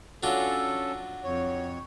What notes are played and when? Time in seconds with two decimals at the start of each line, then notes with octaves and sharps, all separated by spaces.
0.23 F#3 C#4 D4 F4 A4
1.24 F2 C#5